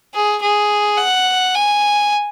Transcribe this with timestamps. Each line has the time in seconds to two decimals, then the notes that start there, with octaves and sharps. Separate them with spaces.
0.14 G#4
0.42 G#4
0.98 F#5
1.54 G#5